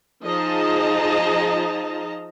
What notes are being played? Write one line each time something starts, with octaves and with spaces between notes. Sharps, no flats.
F3 D#4 G#4 D#5 A5 A#5